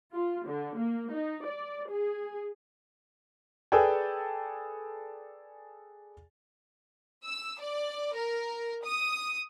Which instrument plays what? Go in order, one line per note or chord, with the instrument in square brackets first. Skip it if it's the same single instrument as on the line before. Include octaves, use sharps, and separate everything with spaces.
[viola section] F4
D3
A#3
D#4
D5
G#4
[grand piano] G#4 A4 B4 D5 G5 G#5
[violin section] E6
D5
A#4
D#6